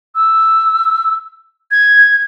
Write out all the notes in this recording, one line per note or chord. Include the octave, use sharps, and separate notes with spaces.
E6
G#6